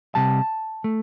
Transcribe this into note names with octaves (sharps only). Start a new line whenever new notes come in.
C3 G3 A5
A3